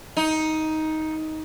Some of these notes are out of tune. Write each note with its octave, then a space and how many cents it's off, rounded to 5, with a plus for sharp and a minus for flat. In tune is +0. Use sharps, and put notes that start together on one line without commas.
D#4 +10